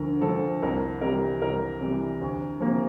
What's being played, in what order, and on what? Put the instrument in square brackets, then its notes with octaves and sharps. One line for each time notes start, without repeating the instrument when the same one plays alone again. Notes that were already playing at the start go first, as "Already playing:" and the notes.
Already playing: [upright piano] D2 D3 F3 A#4
D3 F3 A4
C2 A#4
C3 E3 G3 A#4
C2 A#4
C3 E3 G3
D2
C3 F3 A#3